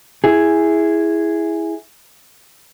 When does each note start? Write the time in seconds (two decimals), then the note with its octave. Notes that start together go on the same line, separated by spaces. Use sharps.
0.24 E4 G#4